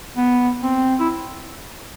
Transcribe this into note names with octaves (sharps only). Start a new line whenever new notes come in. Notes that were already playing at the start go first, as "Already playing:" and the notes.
B3
C4
E4